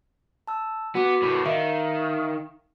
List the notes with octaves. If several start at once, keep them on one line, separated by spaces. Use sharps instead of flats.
A5 E6
B3 F#4 D6
A2 B3
D#3 E5 F5